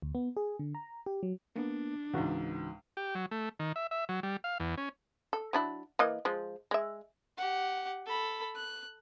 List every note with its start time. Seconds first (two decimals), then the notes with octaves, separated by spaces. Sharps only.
0.02 D2
0.15 B3
0.37 G#4
0.59 D3
0.75 A#5
1.06 G4
1.23 F#3
1.56 A#3 B3 D4
2.13 C#2 G#2 C#3 E3 F#4
2.97 G4
3.15 F#3
3.31 A3
3.59 D#3
3.76 E5
3.91 E5
4.09 F#3
4.23 G3
4.44 F5
4.60 E2
4.77 C#4
5.33 A4
5.53 F#3 D4 E4
5.99 E3 A#3 D#5
6.25 F3 G#3
6.71 G#3 E5
7.38 G4 F#5
8.06 A4 B5
8.56 F#6